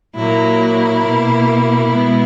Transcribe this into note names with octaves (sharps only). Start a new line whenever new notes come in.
A#2 F#3 A#3 E4
B2 A#3
B2 G#3 B3